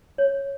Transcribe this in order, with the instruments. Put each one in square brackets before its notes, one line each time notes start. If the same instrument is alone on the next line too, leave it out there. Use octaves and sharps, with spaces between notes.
[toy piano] C#5